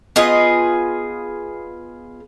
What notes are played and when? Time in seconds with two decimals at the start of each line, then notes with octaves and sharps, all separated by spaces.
0.16 B3 F4 G#4 D#5